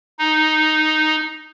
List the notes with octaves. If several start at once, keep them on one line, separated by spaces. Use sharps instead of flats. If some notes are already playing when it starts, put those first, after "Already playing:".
D#4